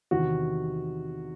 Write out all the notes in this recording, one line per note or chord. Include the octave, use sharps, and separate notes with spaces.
E2 C3 D#3 F#4